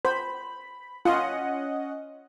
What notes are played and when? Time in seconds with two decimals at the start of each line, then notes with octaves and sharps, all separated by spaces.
0.05 C5 B5
1.05 C#4 F4 D#5 F#5